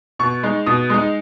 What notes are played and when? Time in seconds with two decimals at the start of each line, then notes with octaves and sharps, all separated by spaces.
0.19 B2 C#6
0.43 G#3 D#4
0.67 B2 D#6
0.90 G#3 D#4